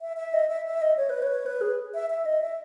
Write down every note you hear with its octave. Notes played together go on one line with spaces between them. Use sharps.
E5
E5
D#5
E5
E5
D#5
C#5
B4
C#5
B4
G#4
E5
E5
D#5
E5